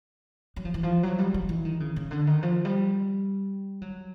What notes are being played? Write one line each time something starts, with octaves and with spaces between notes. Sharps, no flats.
F#3
F3
E3
F3
F#3
G3
F#3
E3
D#3
C#3
C#3
D3
D#3
F3
G3
F#3